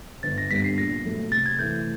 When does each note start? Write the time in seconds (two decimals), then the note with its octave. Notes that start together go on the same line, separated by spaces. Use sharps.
0.23 G1 A6
0.38 A#6
0.51 G2 D3 G3 B3 B6
0.64 C7
0.78 A#2 A#6
1.05 F#3 A3
1.31 C3 A6
1.46 G#6
1.58 E3 A3 G6